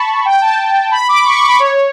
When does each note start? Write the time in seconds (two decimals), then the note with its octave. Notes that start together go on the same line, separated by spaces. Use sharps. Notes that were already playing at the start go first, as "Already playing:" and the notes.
Already playing: A5 B5 C#6
0.25 G5
0.41 A5
0.91 B5
1.09 D6
1.25 C#6
1.36 C#6
1.48 B5
1.59 C#5